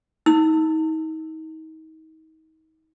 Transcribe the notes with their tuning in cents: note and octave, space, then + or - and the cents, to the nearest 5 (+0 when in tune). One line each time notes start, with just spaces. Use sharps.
D#4 +35 E6 +0